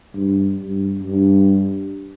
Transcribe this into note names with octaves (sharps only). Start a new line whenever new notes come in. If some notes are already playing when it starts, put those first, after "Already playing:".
G2
G2
G2